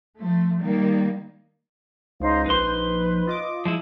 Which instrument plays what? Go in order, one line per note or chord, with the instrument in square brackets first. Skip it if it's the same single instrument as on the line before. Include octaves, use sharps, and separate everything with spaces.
[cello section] F3 A3
D#3 G3 A#3
[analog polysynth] C#2 [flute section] D#4 C5 F5
[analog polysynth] A#1 C5 [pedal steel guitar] D#4 C6 [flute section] B4
[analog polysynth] F4 D#5 D6
[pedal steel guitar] F3 G#3 E4